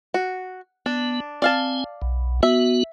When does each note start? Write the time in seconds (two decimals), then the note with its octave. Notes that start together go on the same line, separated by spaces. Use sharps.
0.14 F#4
0.86 B3 D4
1.42 C4 D5 F5 G#5 A5
2.02 B1
2.43 B3 F#4 E5